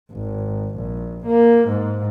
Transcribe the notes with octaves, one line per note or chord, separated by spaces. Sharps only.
G#1
A#1
A#3
G#2